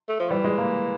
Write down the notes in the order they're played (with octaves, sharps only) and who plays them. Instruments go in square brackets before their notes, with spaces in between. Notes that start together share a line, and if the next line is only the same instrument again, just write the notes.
[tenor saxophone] A3
F3
[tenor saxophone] E3 [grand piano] G3
[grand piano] G#3
A#3